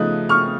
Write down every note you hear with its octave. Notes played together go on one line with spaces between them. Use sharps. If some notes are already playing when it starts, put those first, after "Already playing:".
Already playing: C#3 F3 A3 D#4 D#6 F#6
C#6 F6